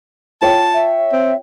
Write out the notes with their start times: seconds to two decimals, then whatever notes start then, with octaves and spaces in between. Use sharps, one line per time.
0.42 F4 C#5 G5 A5
0.74 E5
1.13 C4